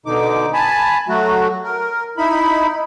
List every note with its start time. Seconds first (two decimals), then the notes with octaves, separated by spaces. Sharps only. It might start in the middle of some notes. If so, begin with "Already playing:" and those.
0.06 B2 D3 D#4 D6
0.53 G#5 A5 B5
1.08 F#3 A3 F#4
1.64 A#4
2.17 D#4 E4 B5